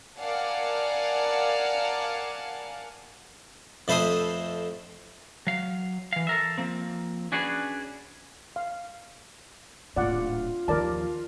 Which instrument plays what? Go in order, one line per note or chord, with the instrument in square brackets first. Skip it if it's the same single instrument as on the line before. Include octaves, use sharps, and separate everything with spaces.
[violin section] A#4 D5 F5 F#5 G#5 A5
[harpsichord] F2 A3 B4 C5 C6 D#6
[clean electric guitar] F#3 F5
E3 F5
A4 A#4 E5
F3 A#3 C4
C#4 D4 F#4 G#4 B4
[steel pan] F5
[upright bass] D1 A#2 [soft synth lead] F4 [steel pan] D5 F#5
[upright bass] D#2 F3 [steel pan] A#4 D5 A5